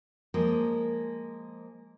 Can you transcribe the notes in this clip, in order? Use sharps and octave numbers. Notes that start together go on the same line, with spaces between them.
F3 G#3 A#3